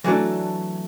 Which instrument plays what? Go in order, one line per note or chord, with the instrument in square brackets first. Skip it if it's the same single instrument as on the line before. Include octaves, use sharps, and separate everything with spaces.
[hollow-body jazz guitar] E3 F#3 A3 D4